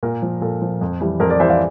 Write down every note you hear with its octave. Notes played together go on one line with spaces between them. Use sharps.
A#2 A#4
F3
A#2 A4
F3
F2
E3 G3
F2 A#4
A#4 D5
E3 G3 C5 E5
D5 F5